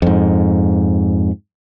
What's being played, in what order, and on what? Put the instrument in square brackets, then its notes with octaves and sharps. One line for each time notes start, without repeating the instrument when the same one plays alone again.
[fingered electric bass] F2 G#2